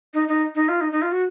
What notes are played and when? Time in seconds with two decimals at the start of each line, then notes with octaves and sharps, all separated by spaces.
0.14 D#4
0.28 D#4
0.55 D#4
0.69 F4
0.81 D#4
0.92 D#4
1.02 F4
1.12 F#4